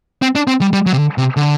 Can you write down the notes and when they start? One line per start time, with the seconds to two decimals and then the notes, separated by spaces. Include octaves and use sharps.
0.22 C4
0.35 D4
0.47 C4
0.61 G3
0.73 G3
0.86 F#3
0.93 C3
0.99 D3
1.18 C3
1.37 D3